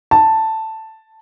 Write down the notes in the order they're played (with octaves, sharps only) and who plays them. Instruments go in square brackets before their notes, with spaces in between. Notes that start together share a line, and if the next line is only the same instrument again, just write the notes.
[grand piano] A5